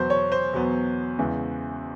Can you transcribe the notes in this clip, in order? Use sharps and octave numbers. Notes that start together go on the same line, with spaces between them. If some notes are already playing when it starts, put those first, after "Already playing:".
Already playing: E2 B2 F#3 B3 C5
C#5
C5
E2 B2 F#3 B3
E2 C#3 E3 G#3